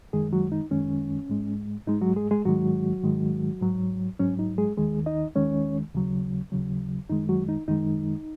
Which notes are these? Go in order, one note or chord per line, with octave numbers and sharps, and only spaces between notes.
F#2 D#3 G#3 G#4
F#3 F#4
D#4
F#2 D#3 G#3 C#4
G#2 G#3
G#2 G#3 D#4
F#3 F#4
G#3 G#4
G#3 G#4
G#2 D#3 F#3 G#3 F#4
G#2 D#3 G#3
G#2 F#3
G#2 F#3 C#4
D#4
G#3 G#4
D#2 D#3 G#3 G#4
D#4 D#5
D#2 D#3 G#3 C#4 C#5
D#2 C#3 F#3
D#2 C#3 F#3
F#2 D#3 G#3 D#4
F#3 F#4
D#4
F#2 D#3 G#3 D#4